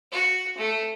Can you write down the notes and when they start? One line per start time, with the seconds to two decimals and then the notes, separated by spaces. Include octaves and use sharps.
0.12 F#4
0.57 A3